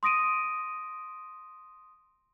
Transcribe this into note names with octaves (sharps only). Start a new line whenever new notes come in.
C6 D#6 A#6 D7 D#7